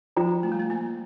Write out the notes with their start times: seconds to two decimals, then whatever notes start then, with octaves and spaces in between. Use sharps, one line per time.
0.16 F3 F4 C5 G5 A#5
0.43 A3
0.52 G3
0.60 A3
0.70 A#3